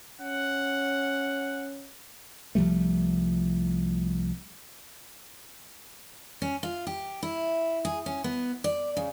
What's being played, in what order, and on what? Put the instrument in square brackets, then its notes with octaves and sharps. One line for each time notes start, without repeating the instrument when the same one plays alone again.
[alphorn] C#4 [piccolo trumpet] F#5
[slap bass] C2 F3 G3 A3
[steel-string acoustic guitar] C#4
F4
G4
E4
G#4
C#4
B3
D5
C#3